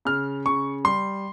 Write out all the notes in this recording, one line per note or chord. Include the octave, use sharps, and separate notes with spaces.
C#3 F6
C#3 C#6
G3 C6